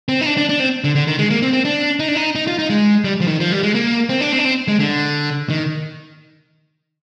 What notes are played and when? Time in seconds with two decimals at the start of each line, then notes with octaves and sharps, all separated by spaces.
0.09 C4
0.21 D#4
0.26 D4
0.37 D4
0.49 D4
0.60 C4
0.84 D3
0.95 D3
1.07 D#3
1.19 G#3
1.30 A#3
1.42 C4
1.53 C4
1.65 D4
2.00 D#4
2.08 D4
2.16 D#4
2.35 D#4
2.47 F4
2.59 D#4
2.70 G#3
3.04 G3
3.21 F3
3.28 D#3
3.40 F3
3.52 G3
3.63 G#3
3.75 A#3
4.09 C4
4.21 D4
4.32 C4
4.38 D4
4.45 C4
4.68 G#3
4.80 D3
5.50 D#3